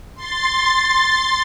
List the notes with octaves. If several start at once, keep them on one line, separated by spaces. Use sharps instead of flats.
C6 A6